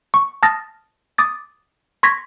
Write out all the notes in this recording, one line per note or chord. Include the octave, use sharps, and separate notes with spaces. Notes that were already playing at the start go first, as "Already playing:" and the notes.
C#6
A5 D#6 F6 A6 A#6
D6 D#6 A6
C6 C#6 G#6 A#6 B6